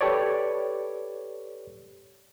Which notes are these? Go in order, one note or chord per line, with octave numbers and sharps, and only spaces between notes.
G4 A4 B4 C#5 D5